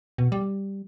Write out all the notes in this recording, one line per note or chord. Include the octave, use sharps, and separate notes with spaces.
B2
G3